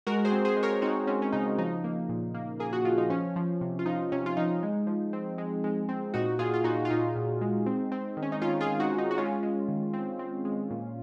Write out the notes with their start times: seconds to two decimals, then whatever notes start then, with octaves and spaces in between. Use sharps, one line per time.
0.07 G#3 F#4 A#4
0.25 G#4 C5
0.32 C4
0.45 G#4 C5
0.57 G#3
0.63 A#4 C#5
0.82 C4 D#4 F#4
1.07 C4 C#4
1.22 C#4
1.32 C#3 D#4
1.58 F3 D#4
1.84 A#3
2.09 A#2
2.34 A#3
2.60 A#3 G#4
2.73 F#4
2.85 F3 F4
2.98 D#4
3.10 F3 C#4
3.36 F3
3.61 C3
3.79 F4
3.86 F3 D#4
4.12 C3 C#4
4.26 F4
4.37 F3 D#4
4.63 G#3
4.87 F3
5.13 C4
5.38 G#3
5.64 G#3
5.89 C4
6.14 A#2 D#4 F#4
6.39 A#2 F4 G#4
6.54 F4
6.64 A#2 D#4 F#4
6.85 F4
6.90 A#2 D#4
7.16 A#2
7.41 G#3
7.66 C4
7.92 C4
8.17 D#3
8.23 C#4
8.32 D#4
8.41 D#3 C#4 F4
8.61 F4 G#4
8.67 D#3
8.80 D#4 F#4
8.93 D#3
8.98 D#4
9.11 F#4
9.18 G#3 C#4 F4
9.43 G#3
9.69 D#3
9.94 C4
10.19 C4
10.45 G#3
10.70 A#2